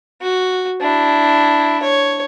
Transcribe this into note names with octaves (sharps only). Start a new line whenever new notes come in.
F#4
D4 E4
C#5